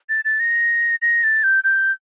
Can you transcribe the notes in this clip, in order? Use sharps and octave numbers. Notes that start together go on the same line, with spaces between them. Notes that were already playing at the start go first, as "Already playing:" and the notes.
A6
A6
A#6
A#6
A6
G6
G6